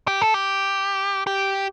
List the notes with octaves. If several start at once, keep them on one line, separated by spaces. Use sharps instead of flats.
G4
A4
G4
G4